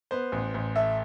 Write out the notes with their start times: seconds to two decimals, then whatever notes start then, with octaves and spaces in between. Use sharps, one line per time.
0.11 B3 C5
0.32 A1
0.54 A1
0.76 A3 E5